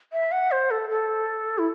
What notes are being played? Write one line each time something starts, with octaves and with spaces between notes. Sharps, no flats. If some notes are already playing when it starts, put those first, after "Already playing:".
E5
F#5
C5
A4
A4
E4